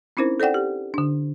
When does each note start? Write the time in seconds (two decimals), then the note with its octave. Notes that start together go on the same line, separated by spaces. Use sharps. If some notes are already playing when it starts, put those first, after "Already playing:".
0.17 C4 C#4 D#4 E4 A#4 C5
0.40 A4 C5 D5 F#5 G5
0.54 G4
0.94 D3 D4